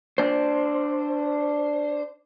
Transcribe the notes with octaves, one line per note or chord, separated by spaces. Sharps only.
D4 C5